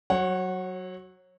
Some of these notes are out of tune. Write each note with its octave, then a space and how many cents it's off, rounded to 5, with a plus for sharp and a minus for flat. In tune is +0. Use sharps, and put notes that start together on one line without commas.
F#3 +5 C#5 -30 F#5 +0